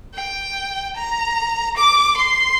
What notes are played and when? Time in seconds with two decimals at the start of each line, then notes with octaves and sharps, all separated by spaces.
0.14 G5
0.96 A#5
1.76 D6
2.16 C6